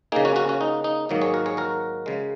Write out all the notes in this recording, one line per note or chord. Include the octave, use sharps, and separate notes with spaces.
C#3 A#3 D#4 G#4
C#4 F#4
C#4 F#4
C#4 F#4
D#4
D#4
G#2 D#3 F#3 A#3 D#4
G#4 C#5
F#4 A#4
G#4 C#5
F#4 A#4
C#3 G#3